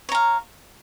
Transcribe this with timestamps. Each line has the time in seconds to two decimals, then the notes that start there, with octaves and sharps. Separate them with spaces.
0.09 C#5
0.12 A#5
0.15 F5